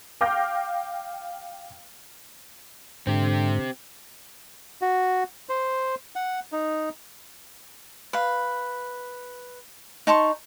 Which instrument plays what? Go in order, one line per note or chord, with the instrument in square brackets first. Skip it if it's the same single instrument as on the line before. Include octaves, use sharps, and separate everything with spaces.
[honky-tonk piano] F5 G5 D6 F6 G6 A#6
[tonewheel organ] G#2 [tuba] D3 [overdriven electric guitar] C4 G4
[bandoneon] F#4
C5
F#5
D#4
[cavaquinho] B4 F5
D#4 A5 C6 C#6